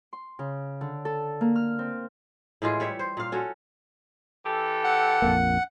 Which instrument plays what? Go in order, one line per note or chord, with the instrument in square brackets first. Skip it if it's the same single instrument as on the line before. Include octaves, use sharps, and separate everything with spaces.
[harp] C6
C#3
D3
A4
A#3
F6
C4
[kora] A2 E3 G#3 F4
G3 C#5 E5
C5
A#2 F5
C#4 F#4 A4
[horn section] E3 G4 A4
[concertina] F#5
[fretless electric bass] A#1 F2 A#3